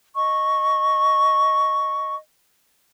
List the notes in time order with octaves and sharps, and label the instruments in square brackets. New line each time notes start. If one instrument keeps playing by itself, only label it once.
[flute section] D#5 C#6